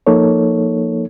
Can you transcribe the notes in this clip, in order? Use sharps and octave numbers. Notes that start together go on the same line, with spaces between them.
F3 A#3 D#4 A4 C#5